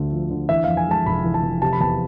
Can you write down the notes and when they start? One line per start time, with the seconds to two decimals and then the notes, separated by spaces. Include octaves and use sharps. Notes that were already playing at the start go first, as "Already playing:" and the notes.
Already playing: D2 D3 A3
0.12 F3
0.30 D3
0.49 E3 E5
0.64 F2 F5
0.77 G#5
0.88 G#3 A5
1.06 F1 B5
1.24 E3
1.34 A5
1.43 F2
1.62 C3 A5
1.73 B5
1.80 E2 A5